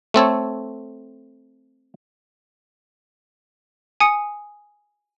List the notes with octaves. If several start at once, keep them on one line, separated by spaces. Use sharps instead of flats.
A3 C4 A4 C#5
G#5 D#6 C#7